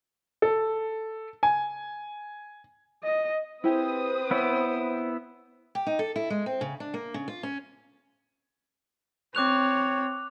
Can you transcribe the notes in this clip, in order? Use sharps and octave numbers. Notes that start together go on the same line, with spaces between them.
A4
G#5
D#5
C4 E4 G4 G#4 B4 C5 D#6
B3 E4 C#5
G4
D#4
A4
E4
G#3
C4
C#3
D4
A#3
C#3
F4
C#4
C4 C#5 D6 F#6 F7